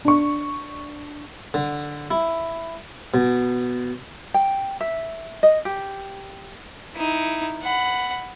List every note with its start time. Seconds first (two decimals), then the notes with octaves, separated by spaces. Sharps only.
0.05 D4 C#6
1.54 D3
2.11 E4
3.14 B2
4.34 G5
4.81 E5
5.43 D#5
5.65 G4
6.94 D#4 E4
7.62 F#5 B5